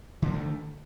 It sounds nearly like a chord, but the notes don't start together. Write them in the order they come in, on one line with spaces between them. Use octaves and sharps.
D3 A#3 D#3 A3